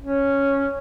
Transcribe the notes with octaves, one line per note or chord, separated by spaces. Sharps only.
C#4